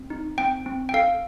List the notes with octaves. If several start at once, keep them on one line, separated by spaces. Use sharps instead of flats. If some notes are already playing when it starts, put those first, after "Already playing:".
Already playing: C4
D#4
C4 G5
C4
G5
A4 F5